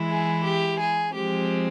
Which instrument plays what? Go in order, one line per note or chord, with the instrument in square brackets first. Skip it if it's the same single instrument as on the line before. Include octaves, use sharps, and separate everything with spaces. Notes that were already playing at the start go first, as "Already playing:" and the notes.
Already playing: [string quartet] E3 G#3 E4
G#4
G4
G#4
F3 G#3 C4 G4